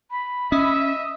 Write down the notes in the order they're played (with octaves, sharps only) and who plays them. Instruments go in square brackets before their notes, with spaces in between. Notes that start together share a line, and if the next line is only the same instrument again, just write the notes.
[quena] B5
[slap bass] C#4 [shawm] D#5 [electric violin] E5